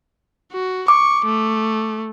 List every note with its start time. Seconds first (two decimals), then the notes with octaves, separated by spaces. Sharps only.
0.52 F#4
0.88 C#6 D6
1.25 A3